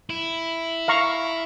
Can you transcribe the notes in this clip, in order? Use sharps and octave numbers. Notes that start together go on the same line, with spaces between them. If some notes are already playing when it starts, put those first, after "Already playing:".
E4
F5 A#5 C#6